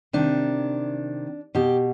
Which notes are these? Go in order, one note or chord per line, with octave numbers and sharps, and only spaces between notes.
C3 D#3 D4
B2 G4